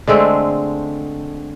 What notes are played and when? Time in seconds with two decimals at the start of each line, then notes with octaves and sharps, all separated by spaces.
0.08 D3 G#3 A3 C4